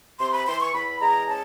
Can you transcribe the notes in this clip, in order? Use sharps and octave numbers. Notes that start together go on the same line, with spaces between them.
C3 C6
B5
E3 C6
C#6
E2 B5
G#3 A#5
C#4 A5